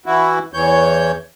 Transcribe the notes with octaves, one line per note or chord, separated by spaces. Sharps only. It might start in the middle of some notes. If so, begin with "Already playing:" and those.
E3 E4 F#4
E2 E3 C#5 G6